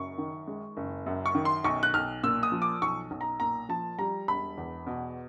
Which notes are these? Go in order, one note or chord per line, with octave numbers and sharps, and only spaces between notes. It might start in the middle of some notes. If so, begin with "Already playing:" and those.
Already playing: F#1 F#2 C#6
D#3
G#3
F#1
F#2
C#6
D#3
C6
B1 C#6
F#6
B1 F6
A#2 E6
D#6
F3
D6
B1 C#6
B1
A#5
A#2 A#5
F3 A5
G3 A#5
E1 B5
E2
B2